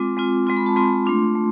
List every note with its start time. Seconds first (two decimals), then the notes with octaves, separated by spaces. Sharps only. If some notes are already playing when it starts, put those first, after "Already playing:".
Already playing: G#3 C4 F4 D6
0.17 G#3 C4 F4
0.46 G#3 C4 F4 C6
0.57 B5
0.66 A5
0.76 G#3 C4 F4 C6
1.05 A3 D4 F4
1.35 A3